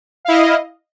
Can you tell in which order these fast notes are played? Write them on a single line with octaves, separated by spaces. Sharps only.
F5 E4 D#5